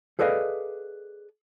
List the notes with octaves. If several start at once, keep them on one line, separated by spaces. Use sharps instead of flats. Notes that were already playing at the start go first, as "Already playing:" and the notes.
G#4 A4 B4 D5 D#5 F5